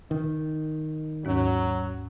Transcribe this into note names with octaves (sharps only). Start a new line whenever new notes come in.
D#3
D#2 G#2 F#3